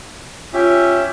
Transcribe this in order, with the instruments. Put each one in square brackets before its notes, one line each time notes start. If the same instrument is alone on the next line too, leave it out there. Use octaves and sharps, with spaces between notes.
[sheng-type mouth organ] C#4 G4 E5 [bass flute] F4